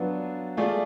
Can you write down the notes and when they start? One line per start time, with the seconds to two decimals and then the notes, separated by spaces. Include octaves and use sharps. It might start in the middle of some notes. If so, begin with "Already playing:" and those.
Already playing: F#3 B3 D4 F4
0.57 A3 F4 G#4 D5